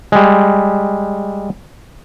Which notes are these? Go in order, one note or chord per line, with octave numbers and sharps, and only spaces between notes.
G3 G#3